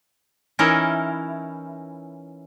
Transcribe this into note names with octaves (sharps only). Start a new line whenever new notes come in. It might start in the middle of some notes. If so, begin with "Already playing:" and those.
E3 C#4 D#4 E4 A#4 D#5